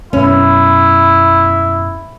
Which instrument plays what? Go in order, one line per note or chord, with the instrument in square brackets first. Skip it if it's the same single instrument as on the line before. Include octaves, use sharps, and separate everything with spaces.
[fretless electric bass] F#2 B2 B3 [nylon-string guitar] C#4 [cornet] E4